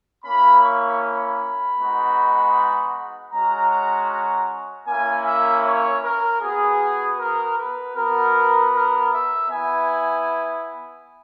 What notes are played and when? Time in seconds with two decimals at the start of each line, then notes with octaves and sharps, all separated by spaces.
0.23 A#3 C#4 E4 B5
0.62 C#6
1.01 B5
1.78 G#3 B3 D#4 F#4
3.32 G#3 C#4 F#4 A#5
3.71 A#5
4.09 A#5
4.86 A#3 C#4 E4 G#5
5.26 E5
5.64 C#5
6.03 A#4
6.42 B3 F#4 G#4
7.19 A#4
7.58 B4
7.95 B3 F#4 A#4
8.73 A#4
9.12 E5
9.50 B3 E4 G#5